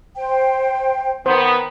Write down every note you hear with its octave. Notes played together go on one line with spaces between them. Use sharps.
C5 G5
D#3 B3 C5